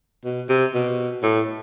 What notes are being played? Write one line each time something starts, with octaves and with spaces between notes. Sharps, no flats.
B2
C3
B2
A2